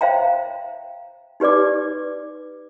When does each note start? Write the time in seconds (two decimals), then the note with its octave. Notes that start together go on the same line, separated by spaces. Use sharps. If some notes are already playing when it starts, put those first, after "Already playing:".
0.01 C5 E5 F5 G5 A#5
1.40 D#4 G4 B4 D5 D6